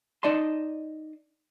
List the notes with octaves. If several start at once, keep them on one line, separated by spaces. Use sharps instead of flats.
D#4 D5 D#5 A5 C6